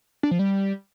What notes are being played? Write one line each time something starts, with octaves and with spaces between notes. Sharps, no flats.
D4
F3
G3